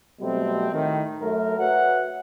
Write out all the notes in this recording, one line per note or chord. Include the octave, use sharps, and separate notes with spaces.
B2 F#3 G3 A3 C4
A2 D#3
F#2 A3 A#4
F#4 B4 C#5 E5 F#5